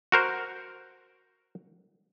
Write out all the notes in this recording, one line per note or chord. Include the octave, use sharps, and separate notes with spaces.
F#4 A#4 C5